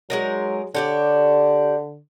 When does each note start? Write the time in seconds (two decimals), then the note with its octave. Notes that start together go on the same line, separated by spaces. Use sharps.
0.10 F#3 G#3 D#4 A#4
0.75 D3 D4 G4 C#5